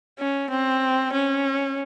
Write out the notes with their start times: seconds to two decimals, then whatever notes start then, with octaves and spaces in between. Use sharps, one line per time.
0.19 C#4
0.51 C4
1.13 C#4